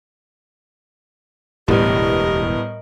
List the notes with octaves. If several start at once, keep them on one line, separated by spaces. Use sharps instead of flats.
E1 D2 A2 G3 B3 G4 A#4 D#5